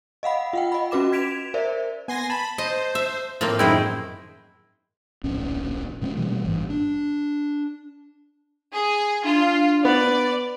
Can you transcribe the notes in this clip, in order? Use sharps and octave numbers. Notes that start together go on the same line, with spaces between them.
D#5 F5 F#5 B5
F4 F#5 G5
D#5 B5
C#4 F#4 B4 D6 E7
G#6 B6 D7 E7 F7
A#4 C5 D5 E5
B3 G#5 C6 A#6
A5 B5
C5 D#5
E5
A2 F3 A#3 C4
F#2 D#3 G#3 E4 G#4 C5 G5
D1 A#1 C#4
A#2 G#3 A3 C#4
B2 E3 G3 A3
G#1 G2
D4
G#4
D4 F4
B3 D5